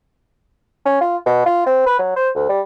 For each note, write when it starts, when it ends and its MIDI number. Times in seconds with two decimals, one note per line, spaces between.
0.85 0.97 61
1.01 1.17 65
1.26 1.43 47
1.46 1.65 65
1.66 1.81 60
1.86 1.98 71
1.99 2.12 54
2.16 2.29 72
2.35 2.45 38
2.49 2.61 55